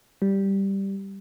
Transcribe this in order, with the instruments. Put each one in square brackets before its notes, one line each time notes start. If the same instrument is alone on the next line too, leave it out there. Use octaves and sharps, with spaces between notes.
[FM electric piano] G3